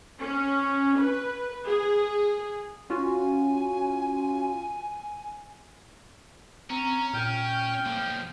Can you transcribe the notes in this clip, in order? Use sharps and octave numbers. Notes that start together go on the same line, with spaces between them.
C#4
B4
G#4
C#4 F4 F#4 G#5
C4 C#4 A#5
A#2 G5 F6
B1 F3 A#3